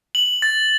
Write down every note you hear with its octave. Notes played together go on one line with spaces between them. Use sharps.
F#7
A6